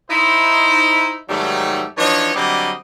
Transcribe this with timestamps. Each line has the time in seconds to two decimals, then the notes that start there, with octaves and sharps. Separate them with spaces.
0.11 D#4 E4 C5
1.29 G#2 D#3 F#3 G3 A3
1.98 E3 F3 D4 D#4 C#5
2.36 D3 F#3 G3 C4 D5 D#5